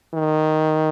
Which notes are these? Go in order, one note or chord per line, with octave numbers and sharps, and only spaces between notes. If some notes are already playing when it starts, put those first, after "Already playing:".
D#3